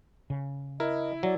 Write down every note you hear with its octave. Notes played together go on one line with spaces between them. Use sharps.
C#3
E4 A#4 D#5
F#3 D5